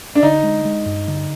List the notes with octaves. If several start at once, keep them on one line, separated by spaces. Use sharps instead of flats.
D4
D3 D#4
G#3
G#3
G2
D3